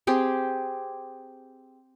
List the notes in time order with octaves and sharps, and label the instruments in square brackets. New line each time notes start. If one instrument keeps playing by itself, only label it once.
[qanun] C4 G4 G#4